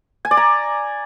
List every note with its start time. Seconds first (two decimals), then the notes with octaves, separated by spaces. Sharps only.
0.25 G#5
0.31 D5
0.37 A#5